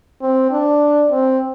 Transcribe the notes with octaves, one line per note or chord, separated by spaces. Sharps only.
C4
D4
C4